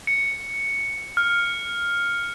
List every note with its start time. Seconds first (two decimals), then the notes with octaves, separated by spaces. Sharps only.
0.07 C#7
1.17 F6